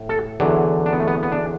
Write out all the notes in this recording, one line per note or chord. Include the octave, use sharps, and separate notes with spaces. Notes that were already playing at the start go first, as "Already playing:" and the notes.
Already playing: A2
A4
E2 D3 F#3
D4
B3
A3
B3
B3
D4